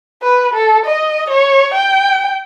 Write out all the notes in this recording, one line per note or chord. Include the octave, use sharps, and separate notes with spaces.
B4
A4
D#5
C#5
G5